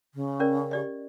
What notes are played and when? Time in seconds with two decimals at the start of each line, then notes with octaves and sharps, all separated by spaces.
0.14 C#3
0.40 C#4 A#4 D5
0.71 G4 D5 D#5